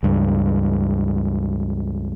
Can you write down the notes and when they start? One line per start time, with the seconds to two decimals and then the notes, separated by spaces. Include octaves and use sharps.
0.03 C#2 G2